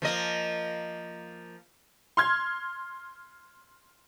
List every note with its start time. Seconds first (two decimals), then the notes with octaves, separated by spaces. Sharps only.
0.02 F3 A#3 D#5
2.17 C6 F6 G#6